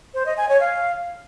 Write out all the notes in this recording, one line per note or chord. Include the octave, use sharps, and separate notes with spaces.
C5
D#5
G#5
C#5
F5